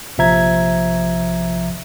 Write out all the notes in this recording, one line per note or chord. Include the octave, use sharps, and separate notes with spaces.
A#1 C3 F3 E5 A#5 G#6